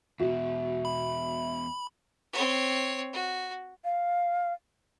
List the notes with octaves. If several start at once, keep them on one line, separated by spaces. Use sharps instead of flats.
E2 B2 F#4 E5
B5
C4 C#5
F#4
F5